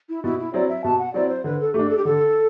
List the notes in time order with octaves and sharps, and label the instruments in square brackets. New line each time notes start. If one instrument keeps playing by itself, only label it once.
[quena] E4
[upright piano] B2 [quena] E4
[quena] E4
[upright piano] F#3 C4 E4 [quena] D5
[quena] E5
[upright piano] B2 [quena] A5
[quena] F#5
[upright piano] F#3 C4 E4 [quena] D5
[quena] C5
[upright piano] D3 [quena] B4
[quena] A4
[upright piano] A3 [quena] G4
[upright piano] D4
[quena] A4
G4
[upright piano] D3 [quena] A4